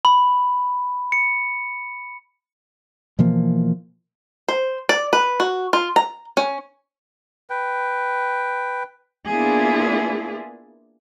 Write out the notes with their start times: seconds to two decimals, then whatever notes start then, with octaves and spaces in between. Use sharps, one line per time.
0.05 B5
1.12 C#7
3.19 B2 E3 F3 A#3
4.49 C5
4.89 D5
5.13 B4
5.40 F#4
5.73 F4
5.96 A#5
6.37 C#4
7.50 B4 G5
9.27 A#3 B3 D4 E4 F4 G#4